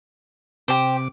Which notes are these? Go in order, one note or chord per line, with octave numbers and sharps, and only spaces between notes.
C3 G4 C5 D6